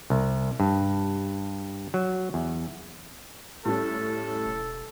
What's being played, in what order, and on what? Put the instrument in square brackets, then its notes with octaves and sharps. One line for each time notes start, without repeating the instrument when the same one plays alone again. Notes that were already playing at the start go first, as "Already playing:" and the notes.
[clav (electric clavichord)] C2
G2
F#3
E2
[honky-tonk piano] A2 G3 C#4 [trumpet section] A4
[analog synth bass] E1